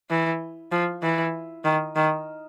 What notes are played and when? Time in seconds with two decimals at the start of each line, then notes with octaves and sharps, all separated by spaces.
0.10 E3
0.72 F3
1.02 E3
1.64 D#3
1.96 D#3